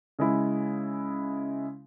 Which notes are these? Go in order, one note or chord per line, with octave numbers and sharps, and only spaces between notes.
C#3 G#3 E4